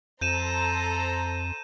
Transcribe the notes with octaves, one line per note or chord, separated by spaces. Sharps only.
F2 A4 C5 A#5 G6 D#7 E7